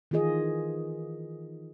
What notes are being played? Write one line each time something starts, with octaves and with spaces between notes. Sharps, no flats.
D#3 E3 F4 G#4 D#5